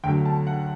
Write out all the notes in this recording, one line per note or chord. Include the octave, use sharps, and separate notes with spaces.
D2 D3 F#3 G5
A5
F#5